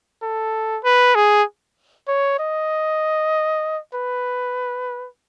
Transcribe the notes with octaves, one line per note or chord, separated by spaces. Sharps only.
A4
B4
G#4
C#5
D#5
B4